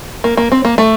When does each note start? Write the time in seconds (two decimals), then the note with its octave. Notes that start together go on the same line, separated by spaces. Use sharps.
0.24 A#3
0.37 A#3
0.52 C4
0.65 A#3
0.78 A3